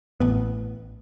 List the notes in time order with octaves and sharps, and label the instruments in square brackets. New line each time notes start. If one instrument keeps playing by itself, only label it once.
[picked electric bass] A1 B3